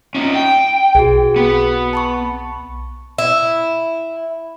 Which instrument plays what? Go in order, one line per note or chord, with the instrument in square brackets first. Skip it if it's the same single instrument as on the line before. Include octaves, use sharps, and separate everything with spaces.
[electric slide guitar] C#4 D#4
G5
[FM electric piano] B1 [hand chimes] F#4 G#4
[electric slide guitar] B3
[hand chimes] A5 B5 C#6
[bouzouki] E4